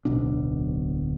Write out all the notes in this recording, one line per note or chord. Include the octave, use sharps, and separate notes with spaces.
D1 B1 B2 D4